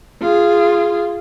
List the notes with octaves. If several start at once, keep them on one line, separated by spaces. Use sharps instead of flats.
F4 G#4